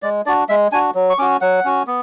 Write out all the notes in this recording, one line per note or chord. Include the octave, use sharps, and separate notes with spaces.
G#3 D5
D4 F#4 D5
G#3 E5
D4 F#4 G#5
F#3
C#6
C#4 F#4 D6
F#3 F#5
C#4 F#4
B3